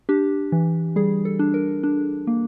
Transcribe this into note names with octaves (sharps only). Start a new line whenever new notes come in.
D4 G4
E3
G3 G#4
A4
D4
A#4
D4
A#3